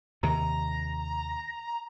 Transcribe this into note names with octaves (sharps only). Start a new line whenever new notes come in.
D#2 C3 D#3 A#5